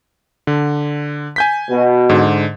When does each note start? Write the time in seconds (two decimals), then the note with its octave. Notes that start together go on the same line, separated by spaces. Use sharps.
0.47 D3
1.36 G#5 G6 B6
1.69 B2
2.09 G#2 D3